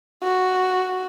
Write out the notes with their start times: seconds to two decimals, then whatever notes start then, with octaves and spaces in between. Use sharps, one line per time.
0.23 F#4